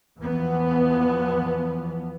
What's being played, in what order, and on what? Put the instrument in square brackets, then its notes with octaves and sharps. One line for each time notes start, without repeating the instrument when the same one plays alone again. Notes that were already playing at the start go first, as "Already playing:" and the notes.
[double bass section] E2 E3 F3 B3